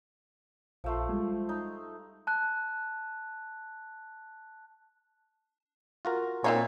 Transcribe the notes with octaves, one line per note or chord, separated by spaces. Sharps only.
A#1 F3 A3 C5
G3 G#3
D#4
A5 F#6
F4 F#4 A#4
A#2 C4 D#4 C#5